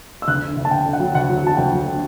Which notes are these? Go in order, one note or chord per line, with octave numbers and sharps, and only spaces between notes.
E6
D2 F#6
D3
D2
A5
D3 G5
D3
F#5
F#3
D2 F#5
F#3
F#3 A5
D2 G5
F#3
D3